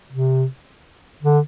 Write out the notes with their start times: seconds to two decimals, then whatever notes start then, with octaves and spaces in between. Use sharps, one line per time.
0.12 C3
1.23 D3